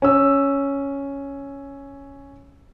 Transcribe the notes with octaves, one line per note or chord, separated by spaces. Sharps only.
C#4 E6